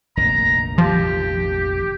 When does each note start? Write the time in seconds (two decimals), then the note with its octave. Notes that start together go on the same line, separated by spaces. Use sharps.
0.17 F1 A#1 D#3 A#5
0.78 F3 G4